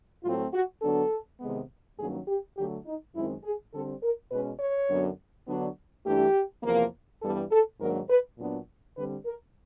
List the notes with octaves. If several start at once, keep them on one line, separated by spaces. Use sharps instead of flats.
A2 F#3 A3 C4 F4
F#4
D3 F#3 B3 D4 A4
C3 D#3 G#3 B3
G2 D#3 F#3 A#3 C#4 G#4
G4
D3 F#3 A3 G4
D#4
F#2 D#3 G#3 C4 E4
G#4
D3 G3 C4 A4
A#4
B2 G#3 C#4 B4
C#5
F#2 D3 F#3 B3 D4
D3 F#3 B3 D4
G2 E3 A3 D4 G4
E2 C3 F3 A#3
G2 E3 G3 B3 A4
A4
G#2 D#3 F#3 A#3 D4 A#4
B4
A#2 F#3 B3 D4
D3 G3 C4 B4
A#4